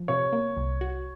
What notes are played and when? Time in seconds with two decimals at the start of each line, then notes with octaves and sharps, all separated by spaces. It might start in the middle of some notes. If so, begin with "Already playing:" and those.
Already playing: F3
0.08 C3 C#5
0.33 A#3
0.57 C2
0.81 F#4